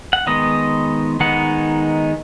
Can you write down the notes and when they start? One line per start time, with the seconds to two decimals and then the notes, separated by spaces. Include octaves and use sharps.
0.13 F#5
0.27 D#3 G#3 B3 D#4 D#5
1.20 D#3 G#3 B3 D#4 F#5